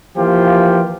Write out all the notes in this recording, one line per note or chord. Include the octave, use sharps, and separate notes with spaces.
E3 F3 A#3 F4 G4